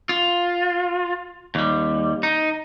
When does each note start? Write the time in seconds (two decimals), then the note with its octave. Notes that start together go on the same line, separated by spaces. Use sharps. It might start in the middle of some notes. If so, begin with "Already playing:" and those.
0.09 F4
1.55 D#2 G3
2.23 D#4